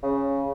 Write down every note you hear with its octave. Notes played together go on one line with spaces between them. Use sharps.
C#3